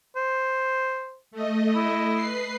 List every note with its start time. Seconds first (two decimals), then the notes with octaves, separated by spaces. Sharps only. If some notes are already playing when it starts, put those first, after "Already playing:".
0.16 C5
1.31 A3 D#5
1.75 E4
2.15 B4 C7